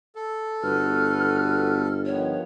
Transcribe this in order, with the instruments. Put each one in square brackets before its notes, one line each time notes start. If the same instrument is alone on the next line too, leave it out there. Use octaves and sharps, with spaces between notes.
[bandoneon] A4
[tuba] G1 [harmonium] B3 F#4 B4 [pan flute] F6
[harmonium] D#3 F3 B3 [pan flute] C#5